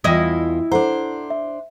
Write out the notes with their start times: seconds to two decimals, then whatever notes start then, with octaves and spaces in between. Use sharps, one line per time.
0.04 E2 E4 F4 D#5 G5 D#6
0.71 D4 A4 C5 F#5 A#5
1.30 E5